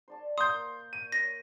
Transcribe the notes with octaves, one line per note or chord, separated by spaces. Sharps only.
C5 D5 A5
A#3 A#4 C5 C6 D#6 G6
C#6 D#7
C#5 C6 A#6